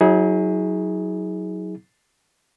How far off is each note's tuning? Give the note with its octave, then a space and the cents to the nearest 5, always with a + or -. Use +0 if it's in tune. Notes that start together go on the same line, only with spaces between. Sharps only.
F#3 +0 E4 -45 G#4 +0